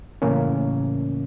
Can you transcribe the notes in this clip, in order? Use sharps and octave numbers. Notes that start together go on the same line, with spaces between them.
A2 C#3 E3 A#3 C#4